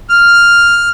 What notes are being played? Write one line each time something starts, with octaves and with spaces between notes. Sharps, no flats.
F6